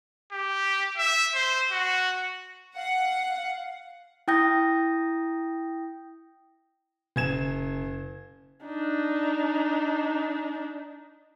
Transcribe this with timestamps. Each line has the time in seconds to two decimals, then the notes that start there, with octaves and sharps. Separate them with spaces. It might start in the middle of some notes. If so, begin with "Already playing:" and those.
0.32 G4
0.97 E5
1.35 C5
1.72 F#4
2.76 F5 F#5
4.28 E4 G5 D#6 G6 A#6
7.16 F#1 G#6 E7
8.66 D4 D#4